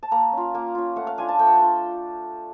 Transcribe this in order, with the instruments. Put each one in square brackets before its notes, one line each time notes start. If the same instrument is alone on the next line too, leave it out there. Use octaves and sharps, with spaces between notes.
[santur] A5
A#3 A#5
C#4 F4
A#3
C#4 F4
A3 F#5
F5
D4 F4 G#5
A5
A3 G5
F#5
G5
D4 F4